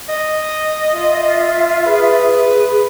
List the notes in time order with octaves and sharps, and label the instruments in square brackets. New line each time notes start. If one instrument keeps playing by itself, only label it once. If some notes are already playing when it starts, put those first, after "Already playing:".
[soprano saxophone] D#5
[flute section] F4 E5
[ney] G#4 [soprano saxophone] B4